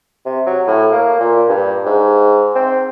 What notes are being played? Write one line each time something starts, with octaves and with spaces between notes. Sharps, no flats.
C3
F#3
A2
A#3
A#2
G2
G#2
C4